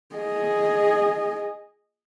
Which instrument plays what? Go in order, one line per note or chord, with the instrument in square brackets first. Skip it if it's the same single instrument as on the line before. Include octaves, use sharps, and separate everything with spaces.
[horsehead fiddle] G#4 D#5